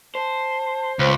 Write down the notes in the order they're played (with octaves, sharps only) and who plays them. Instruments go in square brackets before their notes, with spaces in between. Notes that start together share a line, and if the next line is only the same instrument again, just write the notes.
[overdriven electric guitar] C5 [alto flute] A5
[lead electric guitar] C#2 [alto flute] C5